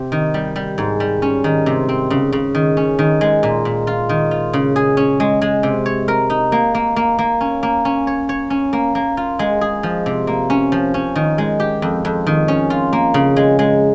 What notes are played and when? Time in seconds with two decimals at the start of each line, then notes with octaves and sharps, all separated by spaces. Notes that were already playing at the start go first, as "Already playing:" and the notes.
Already playing: C3 G4
0.12 D#3
0.34 G3
0.56 G3
0.78 G#2
1.00 G3
1.22 C#4
1.44 D#3
1.66 C3
1.89 C4
2.10 C#3
2.33 C#3
2.55 D#3
2.77 C#4
2.99 D#3
3.21 G#3
3.43 A#2
3.65 A#2
3.87 F4
4.09 D#3
4.31 F4
4.53 C#3
4.76 G#4
4.97 C#4
5.20 G#3
5.42 G#3
5.63 C3
5.86 C#5
6.08 A#4
6.30 D#4
6.52 A#3
6.75 A#3
6.96 A#3
7.19 A#3
7.41 C#4
7.63 A#3
7.85 C#4
8.07 C#5
8.29 C#5
8.50 C#4
8.73 A#3
8.95 A#3
9.17 F4
9.39 G#3
9.61 G#4
9.83 F3
10.06 C3
10.27 A#3
10.50 C#4
10.72 F3
10.94 C#4
11.16 D#3
11.38 G#3
11.60 G4
11.82 F2
12.05 F2
12.27 D#3
12.48 C#4
12.70 F4
12.93 A#3
13.14 C#3
13.36 G#3
13.59 G#3